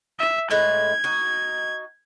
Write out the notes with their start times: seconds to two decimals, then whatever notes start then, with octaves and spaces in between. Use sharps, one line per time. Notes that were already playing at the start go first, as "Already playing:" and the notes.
0.19 E5
0.51 A2 G#3 B4 G#6
1.04 D#4 F#4